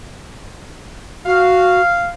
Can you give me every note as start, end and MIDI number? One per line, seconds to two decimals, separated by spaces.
1.26 1.81 66
1.26 2.11 77